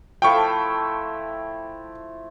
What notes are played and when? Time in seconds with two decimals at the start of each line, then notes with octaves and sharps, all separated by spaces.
0.22 F3 A3 E4 G5 C#6